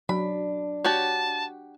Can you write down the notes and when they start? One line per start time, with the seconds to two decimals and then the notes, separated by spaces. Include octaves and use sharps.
0.09 F#3 D4 B5
0.84 F#4 G4 C#5 A5